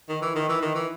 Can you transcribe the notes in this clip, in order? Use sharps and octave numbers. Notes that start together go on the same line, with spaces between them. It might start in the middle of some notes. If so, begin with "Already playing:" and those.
D#3
E3
D#3
E3
D#3
E3